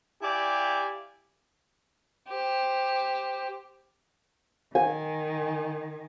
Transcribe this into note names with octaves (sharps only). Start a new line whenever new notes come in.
E4 G4 D5 F5 G#5
G4 C5
D#3 G#5